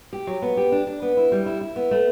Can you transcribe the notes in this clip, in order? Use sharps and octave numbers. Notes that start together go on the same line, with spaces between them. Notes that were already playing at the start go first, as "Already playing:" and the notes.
G4
F#3
B3
G4
D4
D4
B3
E4
G3
E4
E4
B3
A3